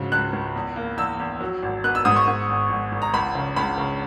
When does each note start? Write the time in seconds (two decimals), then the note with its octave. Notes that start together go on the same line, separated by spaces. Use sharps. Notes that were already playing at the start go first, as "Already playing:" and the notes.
Already playing: G#2 C#3 F#3
0.12 C#2 F#6
0.33 C#2
0.55 E2
0.76 A#3
0.97 E2 E6
1.20 E2
1.41 F#3
1.63 G#1
1.84 B3 F#6
1.95 E6
2.05 G#2 D#6
2.16 C#6
2.28 G#2
2.49 G#1
2.70 G#1
2.92 G#1
3.02 A#5
3.14 C#2 B5
3.35 C#3
3.56 C#2 B5
3.78 C#3